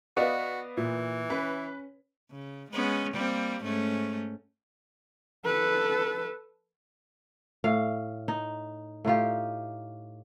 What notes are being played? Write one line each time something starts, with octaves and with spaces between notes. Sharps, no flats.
B3 F#4 D5 D#5 F5
A#2 E3
C#4 B4
C#3
G#3 B3 C#4
G3 A#3 C4
G#2 A3 C#4
A4 B4
A2 F5
D#4
A2 D#4 F4 G4